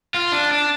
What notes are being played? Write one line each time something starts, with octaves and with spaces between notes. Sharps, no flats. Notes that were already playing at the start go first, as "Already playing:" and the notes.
F4
D4
D4